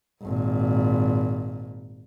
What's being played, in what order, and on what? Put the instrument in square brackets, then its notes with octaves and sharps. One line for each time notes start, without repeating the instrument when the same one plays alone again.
[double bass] G#1 A#2